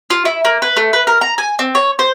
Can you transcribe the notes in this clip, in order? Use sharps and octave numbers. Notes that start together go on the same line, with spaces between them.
F4
E4
A#3
B4
A3
B4
A#4
A#5
G#5
C4
C#5
C5